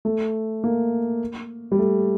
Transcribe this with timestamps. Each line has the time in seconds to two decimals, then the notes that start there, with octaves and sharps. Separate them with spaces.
0.05 A3
0.64 A#3
1.72 G3
1.79 A3